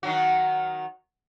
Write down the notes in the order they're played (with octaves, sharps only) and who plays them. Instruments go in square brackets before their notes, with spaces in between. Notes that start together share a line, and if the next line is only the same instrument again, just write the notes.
[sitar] D#3 F#3 F#4